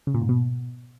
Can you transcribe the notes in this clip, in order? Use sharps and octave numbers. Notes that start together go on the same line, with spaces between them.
C#3
A#2
G#2
B2